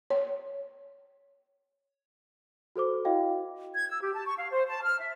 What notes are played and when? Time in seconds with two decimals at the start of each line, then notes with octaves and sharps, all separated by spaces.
0.10 C#5
2.76 F#4 A4 C5 D6
3.05 E4 F#4 D#5 F5 G5
3.75 G#6
3.88 E6
4.02 G4
4.14 A5
4.26 C#6
4.37 F5
4.51 C5
4.67 A5
4.83 F6
4.99 E5